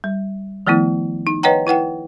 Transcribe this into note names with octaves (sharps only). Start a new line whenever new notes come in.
G3
D#3 F3 A3 B3 E4
D#4
B4 C#5 D#5 F#5 G5 A#5
E4 B4 F#5 G5